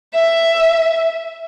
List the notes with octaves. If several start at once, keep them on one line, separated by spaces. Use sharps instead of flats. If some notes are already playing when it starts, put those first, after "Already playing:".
E5